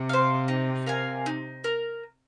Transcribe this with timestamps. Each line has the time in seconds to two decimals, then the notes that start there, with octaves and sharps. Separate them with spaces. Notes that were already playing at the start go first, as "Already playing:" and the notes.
Already playing: C3
0.09 C5 F5
0.48 D#4
0.86 A#4 F5 G#5
1.26 D#4
1.64 A#4